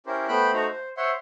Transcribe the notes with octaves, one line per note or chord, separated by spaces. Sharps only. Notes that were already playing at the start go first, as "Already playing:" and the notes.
C#4 E4 G4 A#4 C5
A3 B3 C5 G5 B5 F#6
A3 D#4 F#4 C5 A#5
C5
C5 C#5 E5 F#5 C6